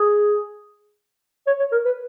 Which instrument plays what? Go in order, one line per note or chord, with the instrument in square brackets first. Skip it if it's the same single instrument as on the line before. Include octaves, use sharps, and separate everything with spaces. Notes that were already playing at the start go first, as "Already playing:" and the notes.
Already playing: [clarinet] G#4
C#5
C#5
A#4
B4